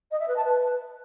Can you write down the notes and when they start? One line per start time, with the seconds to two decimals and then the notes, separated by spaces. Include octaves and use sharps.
0.11 D#5
0.19 E5
0.28 B4
0.36 A5
0.44 B4